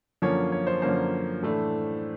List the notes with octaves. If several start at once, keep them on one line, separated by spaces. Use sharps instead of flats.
F#2 D3 F3 A#3 C#4 C#5
C#5
C5
F#2 D3 F3 A#3 C#4 C5
A2 E3 A3 D4